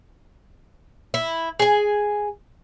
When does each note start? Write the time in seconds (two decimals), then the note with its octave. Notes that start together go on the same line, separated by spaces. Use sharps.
1.14 E4
1.59 G#4 G#5